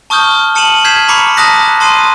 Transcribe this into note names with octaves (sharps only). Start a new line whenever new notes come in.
A5 C#6 D#6 F6 G6 G7
A5 C#7 D#7 E7 F#7
F6 G6 G#6 B6 C7 E7
A#5 B5 C#6 D6 C7 C#7
A5 A#5 D#6 F#6 A#6 B6
A5 C6 D#6 F#6 C7 D#7